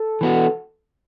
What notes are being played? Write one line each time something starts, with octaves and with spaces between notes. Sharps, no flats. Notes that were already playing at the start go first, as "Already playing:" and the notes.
Already playing: A4
E3 B3 F#4